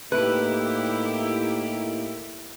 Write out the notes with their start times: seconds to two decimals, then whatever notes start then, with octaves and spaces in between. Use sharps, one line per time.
0.12 A2 A#3 D#4 E4 G4 B4